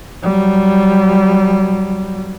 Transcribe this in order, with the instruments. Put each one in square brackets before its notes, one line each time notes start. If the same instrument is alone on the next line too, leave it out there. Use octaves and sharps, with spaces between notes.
[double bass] F#3 G3